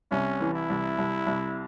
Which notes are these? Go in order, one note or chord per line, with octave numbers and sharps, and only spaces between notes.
C2 C#4
E3
E4
C2
C2
C2